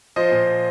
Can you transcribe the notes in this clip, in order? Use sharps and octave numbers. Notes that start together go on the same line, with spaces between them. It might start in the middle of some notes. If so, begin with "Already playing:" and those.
F3 C5 D#5
A#2